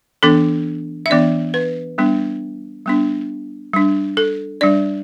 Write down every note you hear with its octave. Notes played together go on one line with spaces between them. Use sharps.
E3 B3 D4 A4
E5
E3 B3 D4 D5
B4
G3 B3 D4
G3 B3 D4
G3 D4
A4
G3 D4 D5